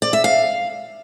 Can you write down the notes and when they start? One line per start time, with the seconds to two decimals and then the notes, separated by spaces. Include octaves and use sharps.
0.02 D5
0.13 E5
0.24 F5